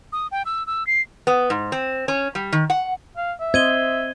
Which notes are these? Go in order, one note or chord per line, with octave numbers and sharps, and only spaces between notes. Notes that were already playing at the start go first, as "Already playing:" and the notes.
D#6
G5
E6
E6
C7
B3
G#2
C4
C#4
G3
D#3
F#5
F5
E5
C4 C5 D#5 G#6 D#7 G7